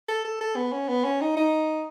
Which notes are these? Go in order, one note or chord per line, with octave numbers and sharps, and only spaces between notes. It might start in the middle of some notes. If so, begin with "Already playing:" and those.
A4
A4
A4
B3
C#4
B3
C#4
D#4
D#4